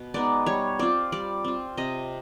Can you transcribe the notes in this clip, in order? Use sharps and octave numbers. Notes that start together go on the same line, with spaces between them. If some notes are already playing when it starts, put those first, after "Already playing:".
Already playing: B2
G#3 B3 D#4 D5
G3 C#5
C4 F4 D5
G3 D5
C4 F4
C3 D#5